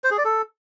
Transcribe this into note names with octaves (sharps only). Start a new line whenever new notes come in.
C5
G#4
D5
A4